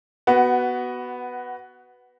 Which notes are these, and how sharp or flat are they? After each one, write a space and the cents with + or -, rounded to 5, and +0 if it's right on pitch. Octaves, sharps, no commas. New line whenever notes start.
B3 +0 F#4 +20